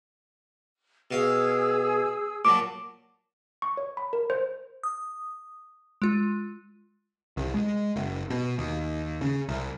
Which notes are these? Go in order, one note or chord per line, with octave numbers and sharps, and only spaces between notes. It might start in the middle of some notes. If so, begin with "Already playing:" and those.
B2 G#4 F5 E6
A#2 F#3 A5 D6
C#6
C#5
B5
A#4
C5
D#6
G#3 F4
C2
G#3
F#1
B2
D#2
C#3
C2